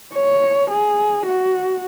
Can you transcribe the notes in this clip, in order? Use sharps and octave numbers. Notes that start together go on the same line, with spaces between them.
C#5
G#4
F#4